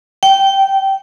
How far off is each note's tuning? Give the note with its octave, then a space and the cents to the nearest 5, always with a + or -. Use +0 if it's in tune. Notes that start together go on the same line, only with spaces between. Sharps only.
G5 -20